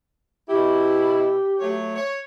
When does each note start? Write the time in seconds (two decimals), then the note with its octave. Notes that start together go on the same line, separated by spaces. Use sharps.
0.49 B2 E4 G4
1.60 F#3 A3 C#5
1.96 C#5